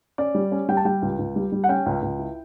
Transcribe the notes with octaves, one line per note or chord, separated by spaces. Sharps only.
C#4 D5
G3
C#4
G3 G5
A5
G3 G5
C#2
C#2
G3
G3
F#5
C#4 G5
C#2
C#2
E4